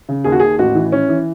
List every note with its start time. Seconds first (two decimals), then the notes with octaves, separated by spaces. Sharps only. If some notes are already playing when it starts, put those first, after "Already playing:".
0.09 C#3
0.24 D#2 G#4
0.32 F#4
0.40 D#2 G#4
0.59 A1 F#4
0.75 E3
0.92 E3 C#4
1.09 E3